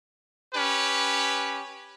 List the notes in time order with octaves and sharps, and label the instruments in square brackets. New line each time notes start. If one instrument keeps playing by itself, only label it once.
[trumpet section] C#4 G4 B4